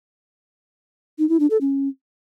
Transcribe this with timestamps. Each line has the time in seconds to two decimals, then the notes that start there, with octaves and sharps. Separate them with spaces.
1.19 D#4
1.29 E4
1.40 D4
1.50 A4
1.61 C#4